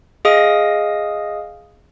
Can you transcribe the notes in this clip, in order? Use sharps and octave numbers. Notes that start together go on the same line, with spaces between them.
G#4 D#5 F5 D#6 A#6